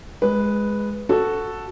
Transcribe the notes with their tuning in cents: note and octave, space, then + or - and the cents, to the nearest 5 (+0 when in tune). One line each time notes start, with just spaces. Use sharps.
G#3 +0 B4 +0
F#4 +0 A4 +0